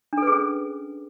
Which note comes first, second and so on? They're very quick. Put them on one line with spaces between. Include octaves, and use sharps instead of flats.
D4 A4 B4 G#4 C#4